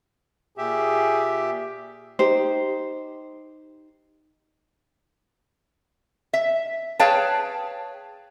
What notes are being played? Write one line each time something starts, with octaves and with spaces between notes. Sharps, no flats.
A#2 G4 G#4 E5
D#4 G4 C5
E5
G#4 B4 C#5 F5 G5 A5